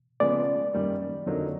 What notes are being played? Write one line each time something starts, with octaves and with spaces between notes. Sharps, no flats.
C#3 F3 G#3 B3 D5
F#2 D#3 G3 A#3
F2 D3 F#3 A#3 D#4